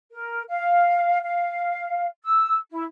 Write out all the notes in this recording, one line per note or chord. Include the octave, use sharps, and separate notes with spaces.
A#4
F5
F5
E6
E4